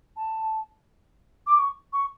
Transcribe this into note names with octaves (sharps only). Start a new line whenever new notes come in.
A5
D6
C#6
C#6